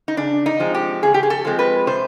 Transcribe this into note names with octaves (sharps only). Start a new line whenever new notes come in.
D#4
C#3 D4
D#4
F3 G#3 C4
G4
C#3 G#4
G4
G#4
A4
F3 G#3 C4
B4
C3 C5